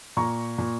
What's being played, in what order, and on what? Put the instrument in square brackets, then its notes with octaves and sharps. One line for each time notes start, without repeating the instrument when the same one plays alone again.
[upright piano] A#2 A#5 C#6
A#2